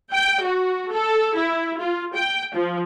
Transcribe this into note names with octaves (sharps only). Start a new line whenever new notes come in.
G5
F#4
A4
E4
F4
G5
F3